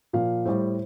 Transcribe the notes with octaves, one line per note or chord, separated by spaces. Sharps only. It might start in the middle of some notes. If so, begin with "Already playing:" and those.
A#2 F3 F5
A2 G3 C5